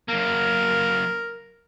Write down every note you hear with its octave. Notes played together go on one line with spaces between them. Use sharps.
F#2 A#3 A#4